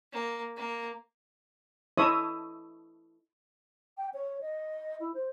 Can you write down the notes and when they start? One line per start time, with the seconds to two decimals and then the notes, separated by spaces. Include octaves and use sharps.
0.13 A#3
0.57 A#3
1.97 E4 A4 C#5 D#5 E5 D#6
3.97 G5
4.14 C#5
4.41 D#5
5.00 E4
5.14 C5